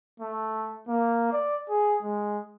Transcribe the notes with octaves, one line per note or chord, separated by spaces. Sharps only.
A3
A#3
D5
G#4
G#3